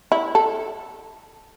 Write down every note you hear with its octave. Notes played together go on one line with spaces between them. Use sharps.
E4
A4